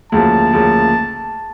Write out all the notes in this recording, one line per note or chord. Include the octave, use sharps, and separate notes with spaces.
D2 C#3 F3 A#3 A5
D2 C#3 F3 A#3